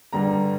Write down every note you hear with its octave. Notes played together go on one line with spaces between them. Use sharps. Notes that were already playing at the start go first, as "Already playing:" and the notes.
G2 D3 G3 A#5